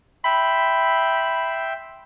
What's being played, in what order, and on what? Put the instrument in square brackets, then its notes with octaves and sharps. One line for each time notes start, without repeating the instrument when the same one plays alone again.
[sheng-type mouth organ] E5 G5 C6 [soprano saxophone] B5